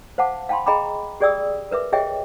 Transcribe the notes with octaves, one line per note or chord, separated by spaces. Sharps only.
C5 F5 F#5 A5 D6
F5 G5 A5 B5 C6
G#4 D#5 G5 A#5 B5 D6
G4 G#4 D5 G5 D#6 E6
A#4 B4 E5 D6
G4 G#4 C#5 D#5 E5 G5